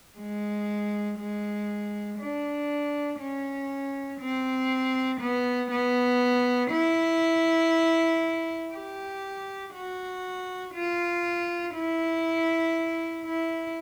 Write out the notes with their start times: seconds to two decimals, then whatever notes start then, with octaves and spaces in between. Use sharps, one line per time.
0.18 G#3
1.18 G#3
2.19 D4
3.20 C#4
4.20 C4
5.20 B3
5.71 B3
6.71 E4
8.72 G4
9.73 F#4
10.73 F4
11.74 E4
13.25 E4